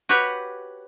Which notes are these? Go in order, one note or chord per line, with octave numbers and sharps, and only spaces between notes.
F#4 G4 B4 C#5 F#5